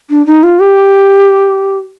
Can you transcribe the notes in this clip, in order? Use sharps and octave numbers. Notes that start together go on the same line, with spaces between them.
D4
D#4
F4
G4